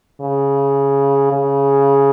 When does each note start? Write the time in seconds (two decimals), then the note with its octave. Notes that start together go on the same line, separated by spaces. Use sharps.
0.21 C#3
1.32 C#3